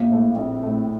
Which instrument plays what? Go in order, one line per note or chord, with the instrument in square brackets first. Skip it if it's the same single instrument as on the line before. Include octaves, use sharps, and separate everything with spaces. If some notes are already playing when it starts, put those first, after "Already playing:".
Already playing: [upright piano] A#1 [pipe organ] A#3
[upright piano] A2 A3
[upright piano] A#1 [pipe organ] C4
[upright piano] A2 A3